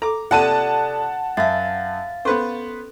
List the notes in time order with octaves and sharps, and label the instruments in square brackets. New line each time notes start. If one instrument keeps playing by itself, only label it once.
[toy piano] A4 [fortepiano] A#5 D6
[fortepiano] C3 [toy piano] F4 [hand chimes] A4 D5 F#6 [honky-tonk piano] F#5 A5 D#7
[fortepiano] F#2 [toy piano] E5 [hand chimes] F5 A6
[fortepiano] B3 B4 C5 [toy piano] C#4 A4 C#6